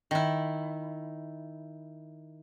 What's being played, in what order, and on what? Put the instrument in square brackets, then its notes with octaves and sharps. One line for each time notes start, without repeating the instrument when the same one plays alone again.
[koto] D#3 E4